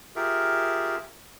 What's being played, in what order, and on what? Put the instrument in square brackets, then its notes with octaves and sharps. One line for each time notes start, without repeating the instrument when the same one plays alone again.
[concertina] F4 G4 G#4 A#4 E5